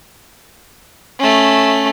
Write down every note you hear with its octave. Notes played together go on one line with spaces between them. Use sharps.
A3 C#4